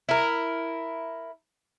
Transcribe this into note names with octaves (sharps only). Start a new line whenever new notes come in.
E4 A#4